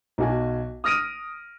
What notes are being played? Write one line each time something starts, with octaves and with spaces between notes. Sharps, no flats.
B1 F#4 G#5
D#6 F6 A#6 D7 D#7